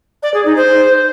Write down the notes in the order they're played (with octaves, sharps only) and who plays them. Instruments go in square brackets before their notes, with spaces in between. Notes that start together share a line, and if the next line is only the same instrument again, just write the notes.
[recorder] D5
G#4
D#4
C5